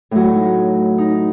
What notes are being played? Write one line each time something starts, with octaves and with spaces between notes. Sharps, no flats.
A2 F#3
D#4
D#4